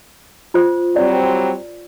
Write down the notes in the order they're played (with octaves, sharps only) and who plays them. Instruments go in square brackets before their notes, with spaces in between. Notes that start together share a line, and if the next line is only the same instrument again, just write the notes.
[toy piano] F4 C5
[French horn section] F#3 G3 C4 [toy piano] D5